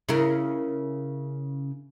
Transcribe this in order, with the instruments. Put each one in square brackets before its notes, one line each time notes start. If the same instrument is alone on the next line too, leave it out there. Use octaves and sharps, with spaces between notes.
[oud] C#3 E4 A#4